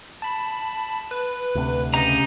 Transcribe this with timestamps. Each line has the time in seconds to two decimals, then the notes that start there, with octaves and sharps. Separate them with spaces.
0.22 A5 B5
1.11 B4
1.55 D2 C3
1.94 C#3 D#4 G4 A#5